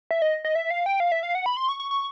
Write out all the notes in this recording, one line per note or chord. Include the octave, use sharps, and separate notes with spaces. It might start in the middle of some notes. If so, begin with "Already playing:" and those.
E5
D#5
D#5
E5
F5
G5
F5
E5
F5
F#5
B5
C6
C#6
C#6
C#6